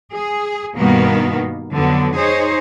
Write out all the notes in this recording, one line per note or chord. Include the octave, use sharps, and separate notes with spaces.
G#4
G2 B2 D#3 G3 A#3 B3
F2 D3 F#3 B3
D#4 G#4 C5 C#5